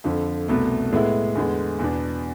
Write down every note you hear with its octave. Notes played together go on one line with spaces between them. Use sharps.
F2 D3 F3
C2 B2 A3
A2 G#3 B3 E4
E2 D3 G#3 B3
E2 B2 B3 D4